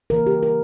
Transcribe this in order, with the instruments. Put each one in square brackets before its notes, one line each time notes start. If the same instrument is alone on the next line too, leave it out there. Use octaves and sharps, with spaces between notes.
[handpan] C#3 E3 A#3 A#4
G4
A#4